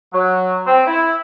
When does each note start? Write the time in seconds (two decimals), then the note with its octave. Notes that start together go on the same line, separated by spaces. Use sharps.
0.13 F#3
0.66 C4
0.86 E4